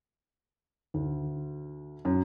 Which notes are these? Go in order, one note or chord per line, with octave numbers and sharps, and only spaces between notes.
D2
F#2